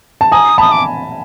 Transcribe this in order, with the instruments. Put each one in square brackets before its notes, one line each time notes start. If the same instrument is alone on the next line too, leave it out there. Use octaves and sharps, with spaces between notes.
[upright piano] A5
[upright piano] G#5 A#5 [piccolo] D#6
[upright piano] A5 B5 [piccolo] D#6
[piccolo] D6